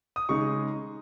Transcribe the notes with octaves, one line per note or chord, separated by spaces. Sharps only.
D#6
C#3 G#3 D#4 C#6